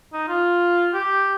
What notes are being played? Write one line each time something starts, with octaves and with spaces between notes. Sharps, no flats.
D#4
F4
G4